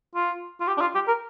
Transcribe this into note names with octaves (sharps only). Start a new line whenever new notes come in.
F4
F4
G4
D4
F4
G4
A#4